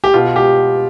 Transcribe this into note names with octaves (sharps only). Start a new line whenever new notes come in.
G4
B2 F4
G4